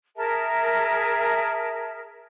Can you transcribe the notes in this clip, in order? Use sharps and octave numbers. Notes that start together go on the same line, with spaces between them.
G#4 A#4 E5 A5